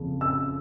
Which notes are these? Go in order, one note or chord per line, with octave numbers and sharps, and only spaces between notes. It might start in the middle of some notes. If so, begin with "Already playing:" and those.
Already playing: F#1 F2 C#3
E6